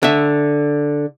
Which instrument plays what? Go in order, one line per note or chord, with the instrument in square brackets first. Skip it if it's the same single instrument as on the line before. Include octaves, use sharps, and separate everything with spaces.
[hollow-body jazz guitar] D3 E5